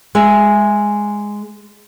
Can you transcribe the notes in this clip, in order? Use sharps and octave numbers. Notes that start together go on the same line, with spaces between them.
G#3 E5